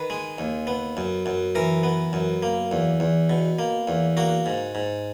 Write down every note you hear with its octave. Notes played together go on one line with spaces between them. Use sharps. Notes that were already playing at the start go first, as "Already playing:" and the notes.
Already playing: D#3 B4
G#3
D#2
B3
F#2
F#2
E3 A#4
B3
F#2
A#3
E2
E2
B2
A#3
E2
A#3 F#4
G#2
G#2